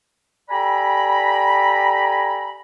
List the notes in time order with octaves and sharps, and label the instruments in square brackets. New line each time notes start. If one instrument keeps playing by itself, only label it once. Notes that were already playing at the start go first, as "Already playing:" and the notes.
[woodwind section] G4 A4 D5 G#5 A#5 B5